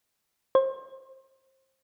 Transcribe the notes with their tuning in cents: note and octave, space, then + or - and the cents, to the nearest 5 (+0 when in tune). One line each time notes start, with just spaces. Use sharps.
C5 +30